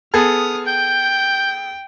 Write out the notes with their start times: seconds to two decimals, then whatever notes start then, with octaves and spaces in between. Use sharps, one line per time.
0.14 B3 G#4 A4 D#6 F6
0.67 G5 G6